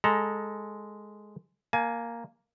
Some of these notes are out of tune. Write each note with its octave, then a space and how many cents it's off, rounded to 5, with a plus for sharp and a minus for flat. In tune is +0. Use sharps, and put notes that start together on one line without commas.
G#3 +0 A4 +0 A#5 +20
A#3 +0 G#5 +30